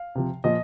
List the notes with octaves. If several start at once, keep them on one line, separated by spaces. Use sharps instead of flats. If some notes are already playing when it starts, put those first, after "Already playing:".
Already playing: F5
C3 F3
A#2 F3 D#5